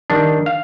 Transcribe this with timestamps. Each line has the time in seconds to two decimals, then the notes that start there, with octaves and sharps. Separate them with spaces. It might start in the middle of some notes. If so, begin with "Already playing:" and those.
0.10 D#3 G3 D4
0.46 F5